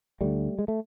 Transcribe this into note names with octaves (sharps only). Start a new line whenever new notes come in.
D2 D3 G3 A3
G#3
A3